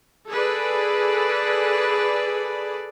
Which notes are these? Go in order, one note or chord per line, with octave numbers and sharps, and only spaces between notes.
G#4 A4 B4 D5